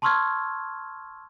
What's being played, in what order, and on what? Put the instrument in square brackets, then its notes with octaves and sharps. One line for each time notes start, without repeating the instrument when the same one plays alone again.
[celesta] A5 C6 C#6 E6 F6 G#6